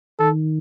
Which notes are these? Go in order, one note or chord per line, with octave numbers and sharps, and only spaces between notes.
D#3 A4